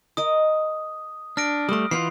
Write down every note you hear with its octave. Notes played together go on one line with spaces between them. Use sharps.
A#4 D#5 D#6
D4 F6 A#6 D7
G3 A3 B4 C6 D#6
E3 F4 B4 F#5 G5 C7